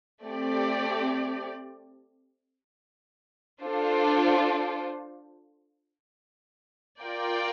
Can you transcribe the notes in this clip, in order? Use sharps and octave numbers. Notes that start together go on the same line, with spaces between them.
A3 C4 G4 D5
D4 F4 A4 C5
F4 A#4 D5 G5